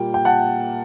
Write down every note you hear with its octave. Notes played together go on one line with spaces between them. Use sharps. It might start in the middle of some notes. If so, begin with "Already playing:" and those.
Already playing: A#2 G3 A#3 G5
G5
F#5 A5